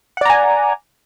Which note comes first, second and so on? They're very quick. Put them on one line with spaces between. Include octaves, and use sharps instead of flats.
F#5 D5 A#5 G#5